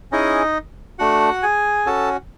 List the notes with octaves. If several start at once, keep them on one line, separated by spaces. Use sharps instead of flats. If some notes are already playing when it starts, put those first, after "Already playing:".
C#4 D#4 E4 G#4 D#5
A3 D4 F#4 F#5
G#4 G#5
C#4 F#4 A4 A5